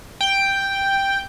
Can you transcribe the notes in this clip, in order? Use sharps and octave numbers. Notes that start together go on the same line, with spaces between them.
G5